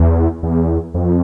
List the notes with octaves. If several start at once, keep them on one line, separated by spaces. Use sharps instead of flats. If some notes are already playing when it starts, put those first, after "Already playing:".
Already playing: E2
E2
F2